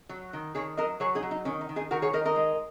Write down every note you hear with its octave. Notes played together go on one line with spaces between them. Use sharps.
F#3
D#3
D#3 G#4 C#5
F#3 A#4 D#5
F#3 G#4 C#5
D#4 G#4
F#3
D#4
D#3 C#4
D#4
D#3
D#4 G#4
D#3 F#4 A#4
G#4 C#5
D#3 A#4 D#5
A#4 D#5
G#3